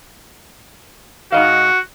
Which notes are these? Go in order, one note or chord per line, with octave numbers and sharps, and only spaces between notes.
G#2 F#4 D#5 F5